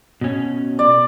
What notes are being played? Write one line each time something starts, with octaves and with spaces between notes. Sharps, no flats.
B2 C#4
D5